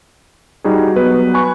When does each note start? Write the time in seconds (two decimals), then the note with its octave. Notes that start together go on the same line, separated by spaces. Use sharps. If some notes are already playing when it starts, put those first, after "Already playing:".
0.64 G3 D#4 F#4 G#4
0.96 F#3 B3 B4
1.34 G#5 B5 C#6 F#6